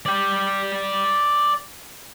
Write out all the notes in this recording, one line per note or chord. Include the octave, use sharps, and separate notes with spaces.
D5 G5